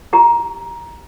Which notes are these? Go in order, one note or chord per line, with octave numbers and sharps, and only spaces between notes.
E4 G4 A#5